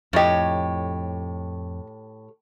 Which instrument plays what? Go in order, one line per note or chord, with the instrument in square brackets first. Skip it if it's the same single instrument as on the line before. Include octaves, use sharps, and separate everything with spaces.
[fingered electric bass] F2 [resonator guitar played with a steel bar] A2 G4 [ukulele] C#5 D#5